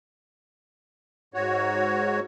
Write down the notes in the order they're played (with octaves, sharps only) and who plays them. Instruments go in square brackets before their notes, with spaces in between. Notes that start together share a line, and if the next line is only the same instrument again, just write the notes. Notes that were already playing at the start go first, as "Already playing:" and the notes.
[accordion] G#2 F#4 C#5